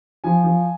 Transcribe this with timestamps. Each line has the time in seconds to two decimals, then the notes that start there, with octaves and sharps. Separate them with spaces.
0.24 F3 G#5
0.44 F3